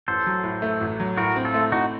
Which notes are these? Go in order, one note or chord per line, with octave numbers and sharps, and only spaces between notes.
A1 A4 C5
F#3
A2
A3
A1
F#3
A2 F#4 A#4
C4
F4 A4
A3
A2 D#4 F#4